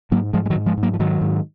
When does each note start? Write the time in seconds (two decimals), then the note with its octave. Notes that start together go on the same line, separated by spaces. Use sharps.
0.11 G#2 F#3 A#3
0.33 G#2 F3 G#3
0.46 G#3
0.50 D#3 F#3
0.55 G#2
0.66 F3 G#3
0.77 G#2
0.83 F#3 A#3
0.94 F3
0.99 G#2 D#3 F#3
1.21 G#2